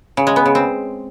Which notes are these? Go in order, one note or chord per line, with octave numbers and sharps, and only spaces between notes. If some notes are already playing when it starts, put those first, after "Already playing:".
C#3
G#3
B3
C#3
C4